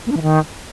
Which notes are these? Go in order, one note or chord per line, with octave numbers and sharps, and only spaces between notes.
A#3
D4
E3
D#3